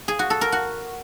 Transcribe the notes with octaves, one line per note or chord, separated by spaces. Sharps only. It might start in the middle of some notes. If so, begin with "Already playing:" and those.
G#4
F#4
A4
A#4
F#4